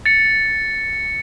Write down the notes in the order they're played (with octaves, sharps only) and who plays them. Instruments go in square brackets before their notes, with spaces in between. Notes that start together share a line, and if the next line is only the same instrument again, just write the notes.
[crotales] A6 C#7